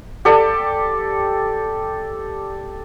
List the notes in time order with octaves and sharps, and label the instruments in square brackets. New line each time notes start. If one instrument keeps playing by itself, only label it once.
[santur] G4 A4 D5